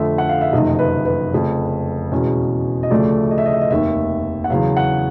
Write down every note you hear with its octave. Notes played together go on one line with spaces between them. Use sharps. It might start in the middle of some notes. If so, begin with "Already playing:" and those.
Already playing: F2 D3 F3 A3 E5
F#5
F5
E5
F#1 F2 C3 D#3 D#5
B4
B4
F1 F2 C#3
E2 B2 G#3 C#4
D#5
D2 C#3 F3 A3 D5
D#5
E5
D#5
E5
D#5
F1 D#2 D#3 E5
F#5
E2 C#3 F#3 F5
F#5